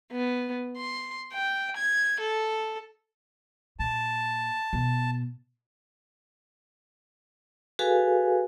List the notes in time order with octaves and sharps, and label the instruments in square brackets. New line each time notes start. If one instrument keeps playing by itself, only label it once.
[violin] B3
C6
G5
G#6
A4
[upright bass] A#2 [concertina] A5
[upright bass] B2
[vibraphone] F#4 G#4 A4 B4 F5 G#5